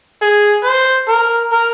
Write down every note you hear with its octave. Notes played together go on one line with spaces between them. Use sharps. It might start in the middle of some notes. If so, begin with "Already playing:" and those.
G#4
C5
A#4
A#4